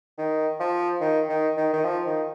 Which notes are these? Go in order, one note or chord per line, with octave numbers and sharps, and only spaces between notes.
D#3
F3
D#3
D#3
D#3
D#3
F3
D#3